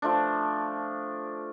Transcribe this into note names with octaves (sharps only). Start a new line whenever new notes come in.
F3 A3 D4